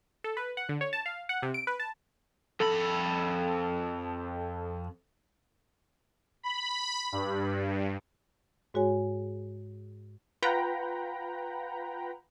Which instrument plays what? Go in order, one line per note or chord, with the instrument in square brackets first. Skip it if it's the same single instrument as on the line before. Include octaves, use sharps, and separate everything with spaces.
[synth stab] A4
B4
F#5
D3
C#5
A5
F5
F#5
C3
D7
B4
A5
[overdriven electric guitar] F2 B5 [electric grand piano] A4
[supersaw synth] B5
G2
[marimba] G#2 G#3 F#4 G#4 C#5 G#5
[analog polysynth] F4 B4 F#5 G5 A#5 B5